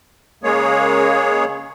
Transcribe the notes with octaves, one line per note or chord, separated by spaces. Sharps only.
C#3 G#3 A#3 G#4 C#5